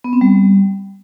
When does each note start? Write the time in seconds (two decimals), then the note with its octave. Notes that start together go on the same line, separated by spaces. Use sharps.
0.04 B3
0.13 C4
0.21 G3